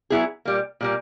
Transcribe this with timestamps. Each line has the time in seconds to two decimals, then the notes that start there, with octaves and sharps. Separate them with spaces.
0.10 F#3 B3 E4 G#4
0.45 A#2 G3 A#3
0.81 A#2 G3 A#3